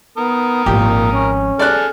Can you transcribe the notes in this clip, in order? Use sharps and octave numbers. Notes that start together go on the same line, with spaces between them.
B3 A#4 D#6
G#1 A#2 F3 G4
C#4
G#4 A4 D5 F6 F#6